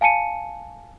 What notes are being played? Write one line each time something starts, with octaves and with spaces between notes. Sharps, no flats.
F5 G#5 A5 C#7 D#7